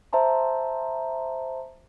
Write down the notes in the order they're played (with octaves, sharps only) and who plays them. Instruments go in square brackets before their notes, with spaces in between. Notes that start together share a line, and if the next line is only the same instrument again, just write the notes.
[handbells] C5 E5 A5 A#5 C6